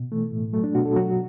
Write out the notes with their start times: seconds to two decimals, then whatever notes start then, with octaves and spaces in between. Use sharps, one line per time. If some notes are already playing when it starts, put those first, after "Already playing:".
Already playing: B2
0.12 E3 A3
0.32 A2
0.53 F#3 A3
0.64 D4
0.75 B2 F#4
0.85 A4
0.96 F#3 F#4